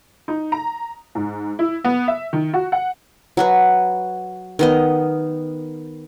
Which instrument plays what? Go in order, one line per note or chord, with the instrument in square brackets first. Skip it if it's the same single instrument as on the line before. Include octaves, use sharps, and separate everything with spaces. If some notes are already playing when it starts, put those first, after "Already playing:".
[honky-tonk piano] D#4
A#5
G#2
E4
B3
E5
D#3
F#4
F#5
[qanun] F#3 F#4 B4
D#3 B3 D#5